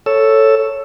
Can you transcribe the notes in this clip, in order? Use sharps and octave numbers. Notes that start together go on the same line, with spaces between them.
A4 C#5 E6